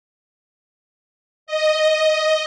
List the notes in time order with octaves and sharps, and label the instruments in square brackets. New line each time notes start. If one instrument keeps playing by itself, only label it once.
[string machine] D#5